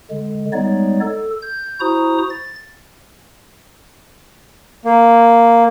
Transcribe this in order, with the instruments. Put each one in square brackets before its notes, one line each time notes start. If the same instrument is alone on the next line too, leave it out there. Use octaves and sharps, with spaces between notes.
[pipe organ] D3 G#3
G3 G#3 B3 D#4 C#5 D5
A4
G6
E4 F#4 C5 A#5 D#6
A6
[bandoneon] A#3